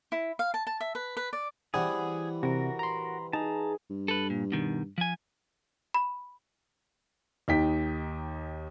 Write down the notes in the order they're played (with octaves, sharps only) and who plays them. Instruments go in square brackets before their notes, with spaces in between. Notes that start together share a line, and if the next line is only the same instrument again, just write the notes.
[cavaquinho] E4
F5
A5
A5
E5
B4
B4
D5
[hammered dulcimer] E3 F#5 B5 [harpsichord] G3 B3 C4 [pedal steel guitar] G#4
[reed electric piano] C3 [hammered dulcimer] E3 [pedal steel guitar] F#4 A#4
[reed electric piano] A#5 C6
[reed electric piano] D#4 [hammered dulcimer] G#4 [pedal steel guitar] A5 A#5
[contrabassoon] G2
[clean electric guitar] A4 B4
A#2
B2 D#3
F3 G#5
[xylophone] B5
[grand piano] D#2 D#4 G5 B6